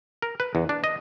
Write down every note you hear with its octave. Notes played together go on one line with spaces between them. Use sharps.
A#4
B4
E2
D4
D#5